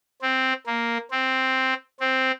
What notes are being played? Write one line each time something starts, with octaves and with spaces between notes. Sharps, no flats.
C4
A#3
C4
C4